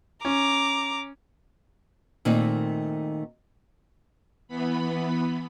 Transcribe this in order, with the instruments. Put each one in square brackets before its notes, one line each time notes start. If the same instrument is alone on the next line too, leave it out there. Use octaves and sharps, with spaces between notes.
[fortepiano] C#4 [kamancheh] A#5 D6
[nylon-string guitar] A#2 D#3 A3 C4 D#4
[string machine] E3 B3 B5